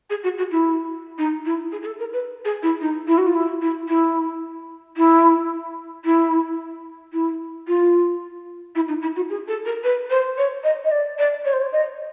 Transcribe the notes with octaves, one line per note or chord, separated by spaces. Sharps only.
G#4
F#4
F#4
E4
D#4
E4
G#4
G#4
A4
A#4
B4
G#4
E4
D#4
E4
F#4
F4
E4
E4
E4
E4
E4
E4
F4
E4
D#4
E4
F#4
G#4
A4
A#4
B4
C5
C#5
D#5
D#5
D5
D5
C#5
C5
C#5
D#5